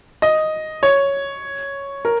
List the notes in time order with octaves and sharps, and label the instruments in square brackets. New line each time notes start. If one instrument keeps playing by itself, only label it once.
[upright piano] D#5
C#5
A#4